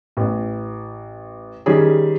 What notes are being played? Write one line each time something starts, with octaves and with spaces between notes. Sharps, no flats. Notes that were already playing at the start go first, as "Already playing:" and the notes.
A1
D#3 G3 C#4 G#4